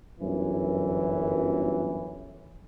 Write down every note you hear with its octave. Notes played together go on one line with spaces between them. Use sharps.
G1 F#2 E3